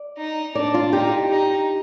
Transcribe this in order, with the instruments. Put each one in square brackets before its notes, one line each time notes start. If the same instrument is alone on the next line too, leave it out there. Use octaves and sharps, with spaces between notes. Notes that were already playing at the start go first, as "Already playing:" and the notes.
Already playing: [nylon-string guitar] D5
[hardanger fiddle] D#4
[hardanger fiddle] D4 [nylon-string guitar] D5
[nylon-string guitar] F4
[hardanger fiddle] D#4 [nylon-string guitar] G4
[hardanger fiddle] D#4